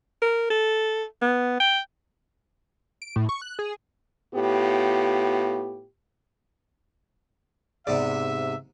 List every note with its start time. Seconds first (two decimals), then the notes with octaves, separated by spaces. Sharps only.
0.22 A#4
0.50 A4
1.22 B3
1.60 G5
3.02 D7
3.16 A2
3.29 C#6
3.42 F#6
3.59 G#4
4.34 A2 B3 F4 G4
7.87 G#2 C3 B3 D5 E5